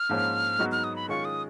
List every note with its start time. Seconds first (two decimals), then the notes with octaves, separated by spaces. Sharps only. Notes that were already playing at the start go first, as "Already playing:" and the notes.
Already playing: F6
0.09 G#2 F3 A#3 C#4
0.59 G#2 F#3 B3 D#4 F#4
0.72 F6
0.84 D#6
0.96 B5
1.08 D#3 G#3 C#4 F4 C#6
1.25 D#6